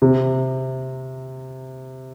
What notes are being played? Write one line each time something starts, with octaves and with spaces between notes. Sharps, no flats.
C3